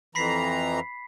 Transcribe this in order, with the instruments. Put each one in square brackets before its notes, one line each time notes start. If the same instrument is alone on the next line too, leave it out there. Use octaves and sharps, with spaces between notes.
[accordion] F2 E3 A#5 [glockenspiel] B5 B6 C7